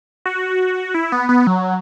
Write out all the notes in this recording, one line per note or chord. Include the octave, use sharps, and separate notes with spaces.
F#4
E4
B3
B3
F#3